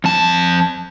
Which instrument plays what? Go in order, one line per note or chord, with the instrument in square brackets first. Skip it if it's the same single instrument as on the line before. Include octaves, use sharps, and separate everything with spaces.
[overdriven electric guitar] F2 A5